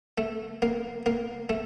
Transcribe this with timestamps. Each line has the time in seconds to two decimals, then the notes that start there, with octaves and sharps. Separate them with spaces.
0.18 A3
0.62 A#3
1.06 A#3
1.49 A3